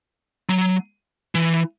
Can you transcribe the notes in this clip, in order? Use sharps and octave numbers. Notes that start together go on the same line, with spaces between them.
F#3
E3